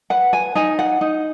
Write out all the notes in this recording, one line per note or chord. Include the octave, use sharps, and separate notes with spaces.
B4 F#5
G#5
D#4 G#5
F#5
D#4